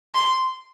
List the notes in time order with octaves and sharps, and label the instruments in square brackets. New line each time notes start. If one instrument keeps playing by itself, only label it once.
[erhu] C6